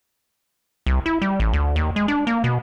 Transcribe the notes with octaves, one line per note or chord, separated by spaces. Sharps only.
C2
E4
G3
A1
D2
D#2
G#3
D4
A#3
B2